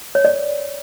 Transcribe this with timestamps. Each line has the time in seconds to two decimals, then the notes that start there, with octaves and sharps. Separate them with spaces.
0.15 C#5
0.25 D5